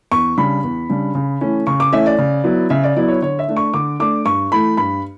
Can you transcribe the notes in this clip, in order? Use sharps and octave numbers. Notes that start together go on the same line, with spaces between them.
E2 C#6
C#3 G3 D4 B5
E2
C#3 G3 D4
C#3
E3 A3 C#4
C#3 C#6
D6
E3 A3 C#4 E5
D5
C#3
F#3 B3 E4
C#3 E5
D5
F#3 B3 E4 D5
C#5
D3 C#5
E5
A3 D4
C#6
D3 D6
A3 D4 D6
G2 C#6
E3 A3 B5
G2 B5